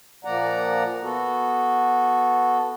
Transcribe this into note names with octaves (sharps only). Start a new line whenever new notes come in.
A#2 F3 A#3 D5 F#5 A#5
B3 F#4 A4